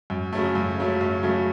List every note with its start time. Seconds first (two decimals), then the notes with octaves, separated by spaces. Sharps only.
0.10 F#2
0.33 C#3 F#3 A3
0.55 F#2
0.78 C#3 F#3 A3
1.01 F#2
1.23 C#3 F#3 A3